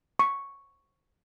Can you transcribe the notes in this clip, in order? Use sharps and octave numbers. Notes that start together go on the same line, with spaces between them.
C#6